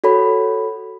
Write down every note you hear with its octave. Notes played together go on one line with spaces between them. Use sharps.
F#4 A4 C#5 B5